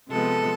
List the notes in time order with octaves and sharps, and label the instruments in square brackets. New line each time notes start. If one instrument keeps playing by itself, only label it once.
[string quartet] C3 F3 G#3 B3 A4